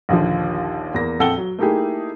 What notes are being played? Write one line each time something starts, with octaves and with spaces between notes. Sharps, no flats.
A#1 D#2 D3 F3
E2 A#3 A#6
A#1 F2 A4 F#5 G5 G7
F#3
A3 A#3 D#4 E4 G4 G#4